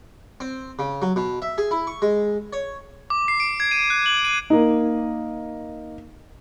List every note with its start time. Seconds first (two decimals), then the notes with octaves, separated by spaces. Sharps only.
0.40 C4
0.79 C#3
1.02 F#3
1.16 B2
1.42 E5
1.58 G#4
1.71 E4
1.87 C#6
2.02 G#3
2.53 C#5
3.10 D6
3.28 C7
3.40 D7
3.60 G#6
3.71 D#7
3.90 F#6
4.06 F#7
4.25 D#7
4.50 A#3 D#4